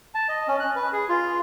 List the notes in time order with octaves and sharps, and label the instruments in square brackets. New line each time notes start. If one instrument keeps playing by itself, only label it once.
[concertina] A5
D#5
C#4
F#6
B4
G#4
F4